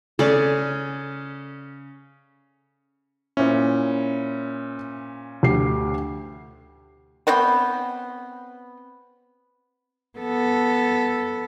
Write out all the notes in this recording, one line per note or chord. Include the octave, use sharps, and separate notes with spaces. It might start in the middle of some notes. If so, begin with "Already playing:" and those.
C#3 C#4 A4 D5
A#2 C#4 E4 C5
D2 G4 C7
B3 C4 C#5 G5
B3 A4